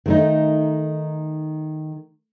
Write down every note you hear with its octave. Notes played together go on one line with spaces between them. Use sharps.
D#3 A3 D#4